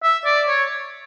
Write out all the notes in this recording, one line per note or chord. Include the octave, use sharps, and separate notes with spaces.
E5
D5
C#5